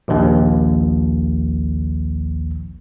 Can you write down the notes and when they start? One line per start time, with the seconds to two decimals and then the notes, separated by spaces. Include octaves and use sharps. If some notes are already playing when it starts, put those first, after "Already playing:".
0.08 A#1 D#2